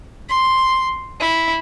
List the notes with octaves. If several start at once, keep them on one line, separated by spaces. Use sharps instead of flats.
C6
E4